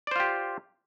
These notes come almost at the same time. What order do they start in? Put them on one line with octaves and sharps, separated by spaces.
D5 C5 F4 G4